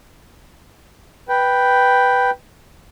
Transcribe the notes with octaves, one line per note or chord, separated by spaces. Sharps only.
B4 G5